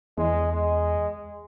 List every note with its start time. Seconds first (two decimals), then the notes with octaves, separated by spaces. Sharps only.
0.18 E2 G#3
0.53 G#3